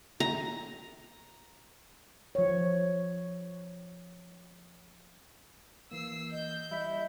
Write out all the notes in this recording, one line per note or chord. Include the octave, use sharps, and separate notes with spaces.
A#5
F3 C#5
E3 A#3 E6 C7
D#5 G6
G3 E4 B6